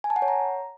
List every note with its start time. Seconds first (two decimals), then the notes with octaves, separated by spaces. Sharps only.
0.04 G#5
0.10 A5
0.16 F#5
0.22 C#5
0.28 A#5